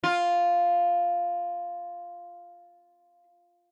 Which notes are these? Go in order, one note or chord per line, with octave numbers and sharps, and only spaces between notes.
F4